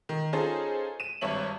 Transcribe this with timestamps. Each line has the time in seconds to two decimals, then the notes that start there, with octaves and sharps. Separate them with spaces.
0.09 D#3
0.33 C#4 D#4 F4 G#4 A4 C5
1.00 D#7 E7
1.21 G#1 G2 C#5 E5 F#7